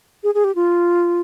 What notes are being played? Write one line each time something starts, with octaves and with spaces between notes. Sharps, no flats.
G#4
G#4
G4
F4